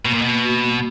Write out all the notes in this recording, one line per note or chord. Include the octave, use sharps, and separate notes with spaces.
B2 A#3
A#2
B2 A#3
F#4
G3